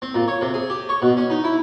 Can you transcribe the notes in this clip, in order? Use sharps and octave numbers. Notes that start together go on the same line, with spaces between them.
C4
A#2
C#5
C3
G#4
G4
C#5
B2
C#4
D#4
E4